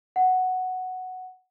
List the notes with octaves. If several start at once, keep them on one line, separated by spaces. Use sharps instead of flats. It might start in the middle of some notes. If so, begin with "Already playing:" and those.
F#5